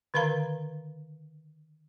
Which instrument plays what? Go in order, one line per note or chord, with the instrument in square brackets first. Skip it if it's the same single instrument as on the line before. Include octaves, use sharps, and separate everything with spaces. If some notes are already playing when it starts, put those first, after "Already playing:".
[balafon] D3 D#3 A#4 F5 A#5